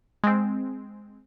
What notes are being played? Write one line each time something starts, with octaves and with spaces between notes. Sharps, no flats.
G#3 C4